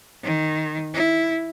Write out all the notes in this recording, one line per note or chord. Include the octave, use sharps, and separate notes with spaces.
D#3
E4